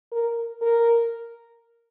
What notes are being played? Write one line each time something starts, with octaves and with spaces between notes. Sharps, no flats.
A#4
A#4